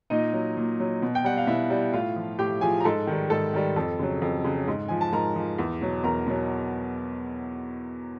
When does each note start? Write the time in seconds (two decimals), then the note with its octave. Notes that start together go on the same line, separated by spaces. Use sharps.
0.10 A#2 D#4 D#5
0.33 F#3
0.57 A#2
0.80 F#3
1.02 B2
1.15 G5
1.24 G3 F#5
1.37 F5
1.47 B2 E4 E5
1.70 G3
1.93 A2 F4 F5
2.16 F3
2.39 A2 G4 G5
2.61 F3 G#4 G#5
2.80 A#5
2.84 G#2 A4 A5
3.07 D#3 G3
3.30 G#2 A4 A5
3.54 D#3 G3
3.76 F2 A4 A5
3.99 C#3 F#3
4.22 F2
4.44 C#3 F#3
4.68 G#2
4.88 F3 G#5
5.01 A5
5.13 G#2 A#4 A#5
5.36 F3
5.59 E2
5.82 B2 F#3
6.04 E2 A#4 A#5
6.27 B2 F#3